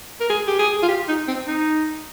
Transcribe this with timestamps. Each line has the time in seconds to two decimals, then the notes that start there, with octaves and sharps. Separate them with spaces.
0.20 A#4
0.30 G#4
0.47 G4
0.59 G#4
0.83 F4
0.88 G4
1.08 D#4
1.28 C4
1.47 D#4